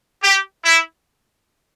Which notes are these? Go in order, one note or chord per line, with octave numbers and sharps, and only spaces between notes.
G4
E4